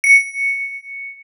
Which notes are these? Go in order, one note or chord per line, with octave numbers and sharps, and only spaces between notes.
C#7